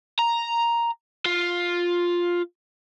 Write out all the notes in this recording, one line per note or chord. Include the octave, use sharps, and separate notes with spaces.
A#5
F4